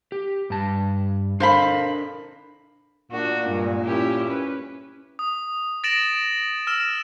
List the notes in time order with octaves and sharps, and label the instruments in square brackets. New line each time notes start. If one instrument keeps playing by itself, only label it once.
[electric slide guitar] G4
G2 A5
[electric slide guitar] D4 A4 A#4 [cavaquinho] C5 F5 B5
[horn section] A#2 [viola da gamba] D4 F#4
[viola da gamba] G2 G#3
C#4 E4 G4
C#4 B4
[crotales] D#6
A6 A#6 D7 E7 F#7
E6 F6 E7